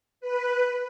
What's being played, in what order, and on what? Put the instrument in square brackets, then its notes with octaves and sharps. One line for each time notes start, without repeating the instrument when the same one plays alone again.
[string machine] B4